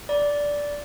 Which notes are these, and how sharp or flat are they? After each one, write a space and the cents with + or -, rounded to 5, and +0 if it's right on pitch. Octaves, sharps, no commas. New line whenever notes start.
D5 -10 A#5 +45